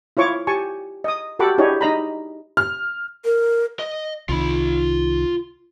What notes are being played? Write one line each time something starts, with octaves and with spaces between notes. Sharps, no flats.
E4 F4 C#5 C#6 D6
G4 G#5 A5 C#6
D#5 D#6
F#4 G4 A4 F#5 B5 D6
D4 E4 G4 G#4 C#5 D#5
D#4 D#5 A#5 B5
F6
A#4
D#5
C2 D#3 F4 B5